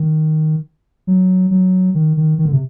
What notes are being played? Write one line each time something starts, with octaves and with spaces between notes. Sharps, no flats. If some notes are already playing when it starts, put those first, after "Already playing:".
Already playing: D#3
F#3
F#3
D#3
D#3
D#3
D3
C3